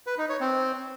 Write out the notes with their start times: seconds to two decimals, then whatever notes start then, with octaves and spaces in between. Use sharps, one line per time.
0.07 B4
0.18 D#4
0.29 C#5
0.41 C4